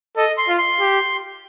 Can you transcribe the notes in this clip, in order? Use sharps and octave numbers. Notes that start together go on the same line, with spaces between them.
A4 D#5
C6
F4
C6
G4